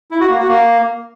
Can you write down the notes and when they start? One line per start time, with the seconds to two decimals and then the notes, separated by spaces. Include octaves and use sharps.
0.11 E4
0.20 F#4
0.30 A#3
0.39 F#4
0.48 A#3